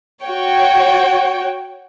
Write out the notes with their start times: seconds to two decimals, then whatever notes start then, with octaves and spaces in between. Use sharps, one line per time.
0.25 F#4 C#5 G5